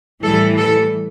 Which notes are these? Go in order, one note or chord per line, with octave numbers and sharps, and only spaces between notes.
A2 E3 G3 A4
A4